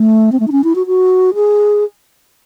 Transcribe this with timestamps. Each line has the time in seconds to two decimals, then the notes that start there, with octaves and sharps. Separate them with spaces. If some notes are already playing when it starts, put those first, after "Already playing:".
Already playing: A3
0.32 C4
0.40 A3
0.47 D#4
0.52 C#4
0.64 E4
0.75 F#4
0.87 F#4
1.34 G#4